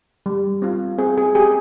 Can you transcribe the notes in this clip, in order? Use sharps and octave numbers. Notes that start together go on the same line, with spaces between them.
G3
C4 F4
C4 G#4
G#4
G4 G#4